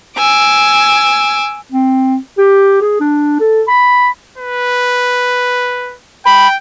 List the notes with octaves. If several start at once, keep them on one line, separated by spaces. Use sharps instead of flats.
G#5 D6 E6
C4
G4
G#4
D4
A4
B5
B4
G5 B5